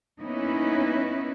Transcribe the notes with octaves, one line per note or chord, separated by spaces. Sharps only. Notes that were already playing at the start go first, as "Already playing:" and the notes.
A#3 B3 C#4 D#4 E4 B4